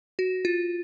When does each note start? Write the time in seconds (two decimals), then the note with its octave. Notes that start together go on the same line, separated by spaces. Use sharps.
0.19 F#4
0.45 F4